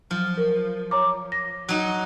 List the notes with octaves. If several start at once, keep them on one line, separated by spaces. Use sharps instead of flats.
F3 F#3
A#4
C#5 A#5 D6
A#6
F#3 D#4